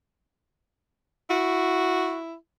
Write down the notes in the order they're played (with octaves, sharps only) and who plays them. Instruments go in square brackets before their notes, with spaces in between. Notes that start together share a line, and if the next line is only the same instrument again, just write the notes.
[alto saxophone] E4 [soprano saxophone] F#4